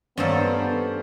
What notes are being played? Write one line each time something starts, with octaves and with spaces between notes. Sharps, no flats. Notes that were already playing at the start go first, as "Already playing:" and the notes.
G2 A#3 B3 C#4 A4 C5 D5